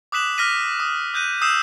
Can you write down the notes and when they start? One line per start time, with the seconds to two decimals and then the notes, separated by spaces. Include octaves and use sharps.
0.12 D6 D#6 F#6 B6 E7 F#7
0.38 D6 F6 A#6 B6 D#7
0.80 D#6
1.14 D#6 F#6 G6 A#6 D#7
1.42 D#6 E6 G6 C7 E7